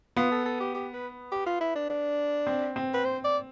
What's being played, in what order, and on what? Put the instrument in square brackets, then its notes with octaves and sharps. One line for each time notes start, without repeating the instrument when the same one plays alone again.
[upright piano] B3 [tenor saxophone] F4
[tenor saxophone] A4
A4
G4
G4
B4
G4
F4
E4
D4
D4
[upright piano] C4
C4
[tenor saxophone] B4
C5
D5